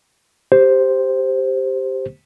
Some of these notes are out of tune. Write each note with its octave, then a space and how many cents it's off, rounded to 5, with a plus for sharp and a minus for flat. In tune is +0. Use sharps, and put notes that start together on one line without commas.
G4 +0 C5 +0